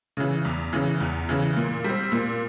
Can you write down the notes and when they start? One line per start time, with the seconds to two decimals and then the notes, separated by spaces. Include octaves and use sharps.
0.17 C#3 E3
0.45 E2
0.73 C#3 E3
1.00 E2
1.29 C#3 E3
1.56 A#2
1.84 G3 C4
2.12 A#2